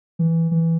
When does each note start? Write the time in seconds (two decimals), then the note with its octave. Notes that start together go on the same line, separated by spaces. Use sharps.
0.19 E3
0.51 E3